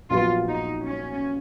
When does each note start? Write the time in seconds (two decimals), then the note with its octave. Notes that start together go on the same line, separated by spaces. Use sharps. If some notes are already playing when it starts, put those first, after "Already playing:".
0.10 A#1 A#2 F#3 B3 F4
0.48 D#4
0.86 C#4